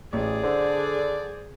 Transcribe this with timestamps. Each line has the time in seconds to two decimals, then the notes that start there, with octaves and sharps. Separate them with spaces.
0.13 A1 G#4 D5
0.43 D3 C5